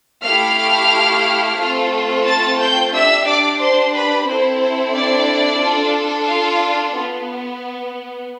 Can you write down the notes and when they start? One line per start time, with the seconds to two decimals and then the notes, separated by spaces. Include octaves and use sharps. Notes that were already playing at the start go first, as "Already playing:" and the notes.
0.23 A3 E4 G4 F5 F6
1.58 A3 C4 F4 A4
2.25 A5 A6
2.59 G5 G6
2.93 D4 G4 E5 E6
3.25 D5 D6
3.60 C5 C6
3.93 B4 B5
4.26 C4 E4 A4 C5
4.60 C5
4.94 D4 D5
5.61 D4 F4 A4
6.28 F4 F5
6.95 B3 F4